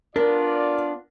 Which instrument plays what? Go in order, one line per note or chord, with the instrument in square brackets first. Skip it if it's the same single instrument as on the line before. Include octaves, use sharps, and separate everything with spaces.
[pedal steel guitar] B3 D4 [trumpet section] F4 D5 [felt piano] A#4